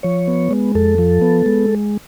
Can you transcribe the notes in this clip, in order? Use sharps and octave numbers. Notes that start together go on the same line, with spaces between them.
F3 C#5
B3
G#3
F2 A4
F3
B3
G#3